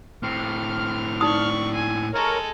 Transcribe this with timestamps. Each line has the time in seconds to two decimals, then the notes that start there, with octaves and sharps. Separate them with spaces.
0.23 A2 C4 F6
1.21 D#4 D5 C#6 D#6
1.74 G#5
2.14 G#3 A4 A#4 C#5